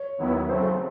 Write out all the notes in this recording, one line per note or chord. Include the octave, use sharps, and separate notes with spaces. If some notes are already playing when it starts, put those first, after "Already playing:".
Already playing: C#5
D#2 D#3 F#3 B3 E4
C#3 F#3 A3 C4 C5